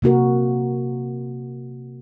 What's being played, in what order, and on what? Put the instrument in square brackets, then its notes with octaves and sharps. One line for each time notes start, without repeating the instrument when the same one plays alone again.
[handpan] C3 A#3 F#4 A#4